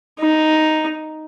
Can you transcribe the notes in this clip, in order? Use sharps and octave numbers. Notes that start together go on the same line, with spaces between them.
D#4